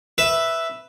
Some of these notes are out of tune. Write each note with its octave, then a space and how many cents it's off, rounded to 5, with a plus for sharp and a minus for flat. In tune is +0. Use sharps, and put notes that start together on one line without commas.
B4 +0 E5 +0